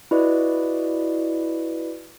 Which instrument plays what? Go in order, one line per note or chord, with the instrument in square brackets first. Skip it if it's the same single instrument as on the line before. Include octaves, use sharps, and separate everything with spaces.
[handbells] E4 F#4 B4 D5 D#5